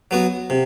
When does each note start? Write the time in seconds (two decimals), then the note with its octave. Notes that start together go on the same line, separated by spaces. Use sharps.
0.11 F#3 B3 F#4
0.50 C3